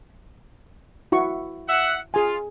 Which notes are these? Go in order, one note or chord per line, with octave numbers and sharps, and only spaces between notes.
E4 F#4 C#6
E5 F#5
F4 G#4 G#5